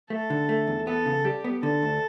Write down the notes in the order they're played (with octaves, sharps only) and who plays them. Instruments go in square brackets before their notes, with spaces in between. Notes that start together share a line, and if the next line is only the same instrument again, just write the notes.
[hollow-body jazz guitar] A3 [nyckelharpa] A4
[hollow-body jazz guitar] D3
A3
E2
[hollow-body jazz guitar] B3 [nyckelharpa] A4
[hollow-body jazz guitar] C#3
[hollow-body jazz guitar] G3 [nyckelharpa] G4
[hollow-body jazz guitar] B3
[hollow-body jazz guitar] D3 [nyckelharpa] A4
[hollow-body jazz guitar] D2